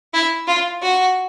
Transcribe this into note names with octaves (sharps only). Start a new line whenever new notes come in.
E4
F4
F#4